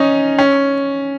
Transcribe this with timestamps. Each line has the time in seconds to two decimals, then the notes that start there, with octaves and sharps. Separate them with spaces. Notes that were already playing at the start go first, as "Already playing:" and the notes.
Already playing: C#4 D#4
0.39 C#4